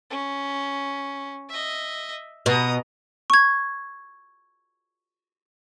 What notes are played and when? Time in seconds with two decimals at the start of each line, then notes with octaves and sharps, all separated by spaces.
0.11 C#4
1.49 D#5 E5
2.46 B2 A#5 D#6
3.30 C#6 G#6